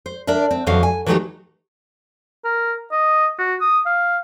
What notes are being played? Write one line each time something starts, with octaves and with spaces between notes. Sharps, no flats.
C5
D4 A#4 D5 E5
C4
F2 D3 E3 F#3 F5
G#5
E3 F#3 A3 D#4 G4 C#5
A#4
D#5
F#4
D#6
F5